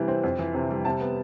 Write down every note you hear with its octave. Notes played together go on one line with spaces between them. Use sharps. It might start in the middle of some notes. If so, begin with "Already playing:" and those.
Already playing: C3 E3 G3
C4
F2
E3
C3
G3
C3 A5
B3